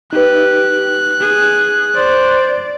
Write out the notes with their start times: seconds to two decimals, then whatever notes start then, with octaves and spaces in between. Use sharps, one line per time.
0.13 D#4 G4 B4 F#6
1.20 G#4
1.95 C5 D5